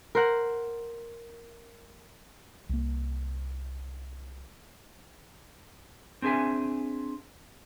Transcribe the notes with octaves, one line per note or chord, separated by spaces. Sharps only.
A#4 C5 F#5
C2 A#3
C4 D4 G#4 E5 G#5